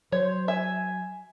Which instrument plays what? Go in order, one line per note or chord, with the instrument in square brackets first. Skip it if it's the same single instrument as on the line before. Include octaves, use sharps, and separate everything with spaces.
[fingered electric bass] F#3 [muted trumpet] C5 [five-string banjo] C#5
[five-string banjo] E5 [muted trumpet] G#5